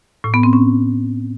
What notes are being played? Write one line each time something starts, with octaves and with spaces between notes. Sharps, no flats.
A2
B3
C4
C#4